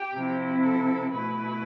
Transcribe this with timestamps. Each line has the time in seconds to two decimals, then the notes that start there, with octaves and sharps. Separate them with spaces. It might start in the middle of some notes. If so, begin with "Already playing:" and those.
Already playing: G4
0.14 C3 F3 C4 E4
0.63 A4
1.12 B2 A3 E4 B4